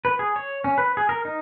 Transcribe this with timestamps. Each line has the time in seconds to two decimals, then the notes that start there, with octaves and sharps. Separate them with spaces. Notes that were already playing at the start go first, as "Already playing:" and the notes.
0.05 B4
0.19 G#4
0.36 C#5
0.64 C#4
0.78 B4
0.97 G#4
1.09 A#4
1.25 D#4